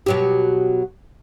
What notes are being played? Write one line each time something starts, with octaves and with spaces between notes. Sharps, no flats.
B2 F#3 G4